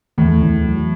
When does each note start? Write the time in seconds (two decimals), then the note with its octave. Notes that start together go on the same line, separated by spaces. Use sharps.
0.18 E2 A2
0.41 E2
0.64 F#3